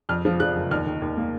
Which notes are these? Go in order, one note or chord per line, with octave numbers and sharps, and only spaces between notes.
F2 F6
F3
F3 F#6
F#1
D#2 F6
D#3
D#2
A#3